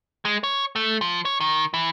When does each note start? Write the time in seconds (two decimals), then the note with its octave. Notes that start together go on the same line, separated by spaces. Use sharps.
0.25 G#3
0.44 C#5
0.76 A3
1.01 F3
1.25 C#5
1.40 D#3
1.74 E3